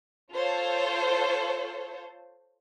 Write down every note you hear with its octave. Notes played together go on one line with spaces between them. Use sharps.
F4 A4 C5 C#5